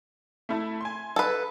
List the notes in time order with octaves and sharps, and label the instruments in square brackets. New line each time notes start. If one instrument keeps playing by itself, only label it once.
[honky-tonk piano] A3 E4 A5
G#5 C6
[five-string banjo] A4 B4